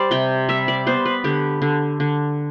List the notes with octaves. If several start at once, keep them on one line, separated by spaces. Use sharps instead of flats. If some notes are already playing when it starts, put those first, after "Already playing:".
Already playing: G3 C5 D5
C3 G5
G3 E5
D5
B3 C5
B4
D3 G4
D3
D3